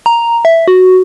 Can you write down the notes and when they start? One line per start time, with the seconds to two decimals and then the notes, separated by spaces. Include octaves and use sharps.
0.06 A#5
0.45 E5
0.68 F#4